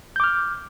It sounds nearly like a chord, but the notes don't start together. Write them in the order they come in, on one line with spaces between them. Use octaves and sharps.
G6 D6 F6